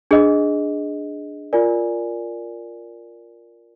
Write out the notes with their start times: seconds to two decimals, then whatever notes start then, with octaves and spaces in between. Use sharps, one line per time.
0.11 D4 G#4 D#5
1.53 F4 A#4 D5 G#5